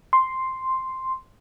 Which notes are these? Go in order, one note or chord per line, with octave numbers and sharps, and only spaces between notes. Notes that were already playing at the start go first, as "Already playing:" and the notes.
C6